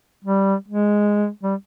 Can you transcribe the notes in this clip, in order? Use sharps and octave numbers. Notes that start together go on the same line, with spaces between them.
G3
G#3
G3